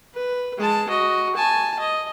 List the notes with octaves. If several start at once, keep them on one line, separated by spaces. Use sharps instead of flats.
B4
G#3 A5
F#4 D#5
G#5 A5
D#5